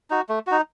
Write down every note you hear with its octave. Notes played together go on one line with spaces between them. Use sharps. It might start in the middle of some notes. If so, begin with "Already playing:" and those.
D#4 F#4
A3
D#4 F#4